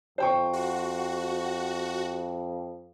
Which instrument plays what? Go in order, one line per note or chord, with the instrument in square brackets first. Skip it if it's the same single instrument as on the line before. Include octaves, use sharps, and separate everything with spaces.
[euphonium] F2 [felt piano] C5 G5 C#6
[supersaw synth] F#4